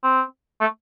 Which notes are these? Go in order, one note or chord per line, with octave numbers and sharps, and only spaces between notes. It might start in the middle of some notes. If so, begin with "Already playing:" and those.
C4
A3